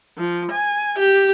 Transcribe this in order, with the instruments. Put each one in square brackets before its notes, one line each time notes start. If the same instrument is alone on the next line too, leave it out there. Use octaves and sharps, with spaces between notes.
[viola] F3
G#5
G4